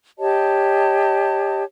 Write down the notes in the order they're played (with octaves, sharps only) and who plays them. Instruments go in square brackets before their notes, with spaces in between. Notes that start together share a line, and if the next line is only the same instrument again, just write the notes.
[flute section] G4 C#5 D#5 A5